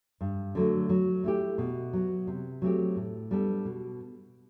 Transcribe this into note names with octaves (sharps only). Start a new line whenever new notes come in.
G2
D3 F#3 A3
F#3
A3 E4 G4
B2
F#3 B3
C3
F#3 A3 C4 G4
A2
G3 B3 D4 A4
B2